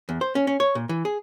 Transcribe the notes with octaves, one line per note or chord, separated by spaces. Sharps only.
E2
C5
C#4
C#4
C#5
A#2
E3
G#4